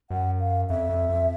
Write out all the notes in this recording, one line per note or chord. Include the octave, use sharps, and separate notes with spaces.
F#2 F#5
F5
F2 E5
F2
F2